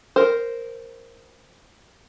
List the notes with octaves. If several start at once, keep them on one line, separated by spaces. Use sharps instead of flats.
A#4 C5